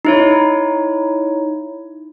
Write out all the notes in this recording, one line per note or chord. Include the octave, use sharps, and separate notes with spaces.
D#4 E4 C#5